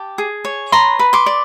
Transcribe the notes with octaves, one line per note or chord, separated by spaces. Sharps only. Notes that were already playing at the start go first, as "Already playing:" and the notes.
Already playing: G4 A5
G#4
C#5
B4 A#5 C6
B4
C6 D6
D5